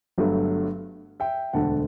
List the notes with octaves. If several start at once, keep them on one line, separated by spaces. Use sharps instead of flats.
G1 G2 F#3 A3
E5 G5
E1 D2 D3 F#5 A5